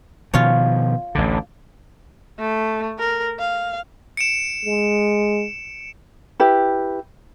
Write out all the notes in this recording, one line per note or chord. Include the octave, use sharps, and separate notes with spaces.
B2 D#3 F3 F4 C#5
A1 D2 D3
A3
A#4
F5
C#7 D7 E7
G#3
E4 G4 B4